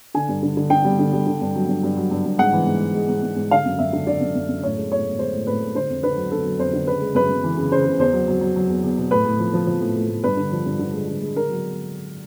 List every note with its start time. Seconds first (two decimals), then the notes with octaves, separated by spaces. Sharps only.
0.15 D3 G#5
0.29 G2
0.43 D3
0.57 D3
0.70 D3 G5
0.85 G3
0.99 D3
1.12 G3
1.27 D3
1.41 G2
1.55 F#3
1.68 G2
1.83 G2
1.97 F#3
2.11 G2
2.25 G2
2.38 G#2 F#5
2.53 E3
2.66 G#2
2.81 G#3
2.95 G#3
3.09 G#2
3.23 G#2
3.36 G#2
3.51 D3 F5
3.65 F#2
3.79 F#2 E5
3.93 D3
4.07 D3 D5
4.21 F#2
4.35 F#2
4.48 F#2
4.63 A2 C#5
4.77 G#3
4.91 A2 C#5
5.05 A2
5.19 G#3 C5
5.33 A2
5.47 A2 B4
5.61 G#3
5.75 D3 C5
5.90 F2
6.03 D3 B4
6.17 F#3
6.31 D3 A4
6.45 F#3
6.59 F2 C5
6.73 D3
6.87 C#3 B4
7.01 G#3
7.15 F#2 B4
7.30 F#2
7.44 E3
7.57 C#3
7.72 C#3 C5
7.86 C#3
7.99 E2 C5
8.13 F#3
8.28 F#3
8.41 F#3
8.56 F#3
8.69 E2
8.84 E2
8.98 B2
9.11 A2 B4
9.25 A2
9.40 F3
9.54 F3
9.67 F3
9.81 A2
9.96 A2
10.09 A2
10.24 G2 B4
10.37 D3
10.52 F3
10.66 G2
10.79 D3
10.94 G#3
11.08 D3
11.21 G#3
11.36 D3 A#4
11.50 F#3